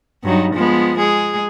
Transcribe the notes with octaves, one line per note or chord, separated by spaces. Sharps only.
G2 F#3 D#4
F3 G#3 B3
G#3 G#4